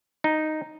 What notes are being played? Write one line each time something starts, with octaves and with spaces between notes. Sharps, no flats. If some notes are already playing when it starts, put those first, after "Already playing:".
D#4